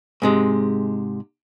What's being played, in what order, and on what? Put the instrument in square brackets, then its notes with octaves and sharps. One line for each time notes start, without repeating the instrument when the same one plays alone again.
[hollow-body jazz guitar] G#2 C3 G#3